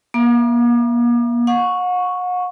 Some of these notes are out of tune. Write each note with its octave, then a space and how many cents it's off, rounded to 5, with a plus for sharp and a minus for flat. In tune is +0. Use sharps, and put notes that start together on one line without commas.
A#3 +40 E5 +45 D6 +40
F#5 -40 C#6 +0